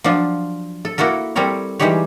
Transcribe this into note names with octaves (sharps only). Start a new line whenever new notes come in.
F3 F#3 D4 F4
A4
A#3 E4 F#4 A4 A#4
G3 C4 A4 A#4 C#5
E3 G3 G#3 D#4 G4 C#5